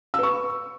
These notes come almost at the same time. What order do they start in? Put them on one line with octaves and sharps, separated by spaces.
E6 B4 C#6